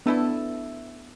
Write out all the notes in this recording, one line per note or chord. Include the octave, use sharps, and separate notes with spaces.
A3 B3 D4 E4 A4